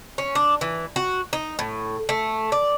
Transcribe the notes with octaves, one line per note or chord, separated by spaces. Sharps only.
C#4
D4
E3
F#4
D#4
A2
A3
D5